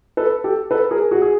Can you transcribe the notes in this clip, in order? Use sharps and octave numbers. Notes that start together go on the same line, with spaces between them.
A4 B4
G4 A4
A4 B4
G#4 A#4
F#4 G#4
G#4